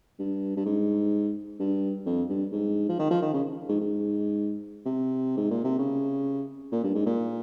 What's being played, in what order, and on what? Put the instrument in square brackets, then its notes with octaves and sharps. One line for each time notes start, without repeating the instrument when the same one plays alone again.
[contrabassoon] G2
G2
G#2
G2
F2
G2
G#2
F3
D#3
F3
D#3
C#3
G#2
G#2
C3
G#2
A#2
C3
C#3
A#2
G2
G#2
A#2